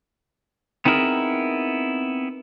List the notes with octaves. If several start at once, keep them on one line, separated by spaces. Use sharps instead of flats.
B3 C4 D#4 E4 G#4 A#4